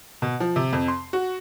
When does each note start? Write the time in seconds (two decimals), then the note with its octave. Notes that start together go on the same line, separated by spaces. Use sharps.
0.22 B2
0.40 F3
0.56 C3
0.73 F2
0.88 C6
1.13 F#4